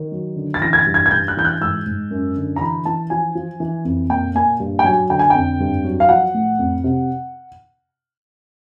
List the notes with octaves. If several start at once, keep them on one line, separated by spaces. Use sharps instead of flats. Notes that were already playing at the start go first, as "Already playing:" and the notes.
Already playing: D#3
F#3
D3
A6
E3 A#6
G#6
A6
G2
G#6
G#6
G2 G6
F#6
E3 G6
F#6
G#2 E6
G#2
F#2
D3
A#5
E3 B5
E3 A5
F3 G#5
F3
E3
F2
A#2 G5
A#2 G#5
G2
G5
F#3 G#5
D3 G5
G#5
F2 G5
G2
F#3
F5
F3 F#5
A2
F2
C3